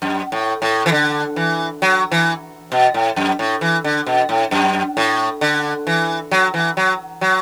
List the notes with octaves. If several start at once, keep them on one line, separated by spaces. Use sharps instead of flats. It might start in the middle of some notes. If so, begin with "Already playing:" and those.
F#2
A2
A2
E3
D3
E3
F#3
E3
B2
A2
F#2
A2
E3
D3
B2
A2
F#2
A2
D3
E3
F#3
E3
F#3
F#3